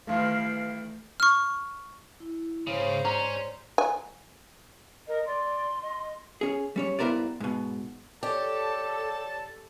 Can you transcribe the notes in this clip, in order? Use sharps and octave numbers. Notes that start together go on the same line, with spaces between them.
D#3 E3 G3 A3 F5
C#6 F6
E4
G#2 C#3 C5 C#5
C#4 C#5 D5 A#5
G#5
A#4 D#5
D5 C6
D#5
C#4 G#4
G3 C#4 C#5
G2 B3 E4 A#4 C5 D5
G#2 B2
G4 A4 C#5 D5 A5